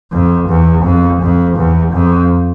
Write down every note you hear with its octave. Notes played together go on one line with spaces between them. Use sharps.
F2
E2
F2
F2
E2
F2